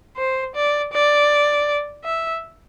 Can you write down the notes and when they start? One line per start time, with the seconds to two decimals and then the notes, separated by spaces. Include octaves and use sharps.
0.17 C5
0.55 D5
0.93 D5
2.04 E5